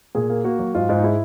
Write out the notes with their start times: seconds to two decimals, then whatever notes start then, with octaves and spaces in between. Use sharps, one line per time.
0.15 A#2 G#4
0.30 A#3
0.44 A#3 F#4
0.59 F#3
0.75 G#2 F4
0.89 G#2
0.98 D#4
1.03 G#3 E4